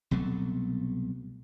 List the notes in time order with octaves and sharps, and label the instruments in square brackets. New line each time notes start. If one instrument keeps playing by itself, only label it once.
[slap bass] C2 B2 F#3 A3